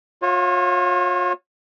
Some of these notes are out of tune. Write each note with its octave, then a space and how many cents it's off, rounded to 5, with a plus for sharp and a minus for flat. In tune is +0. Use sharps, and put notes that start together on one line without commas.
F4 +40 C#5 -25 F5 -45